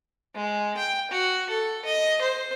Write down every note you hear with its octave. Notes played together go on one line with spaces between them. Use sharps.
G#3
G5
F#4
A4
D#5
C5